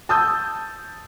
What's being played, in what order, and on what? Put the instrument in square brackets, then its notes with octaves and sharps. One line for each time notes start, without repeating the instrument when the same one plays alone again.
[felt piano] A5 D#6 E6 G6